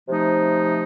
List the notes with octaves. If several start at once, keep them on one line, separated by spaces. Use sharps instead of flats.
C3 F3 A3 D#4